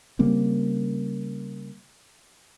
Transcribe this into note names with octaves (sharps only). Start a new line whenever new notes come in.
C#3 G3 A#3 C4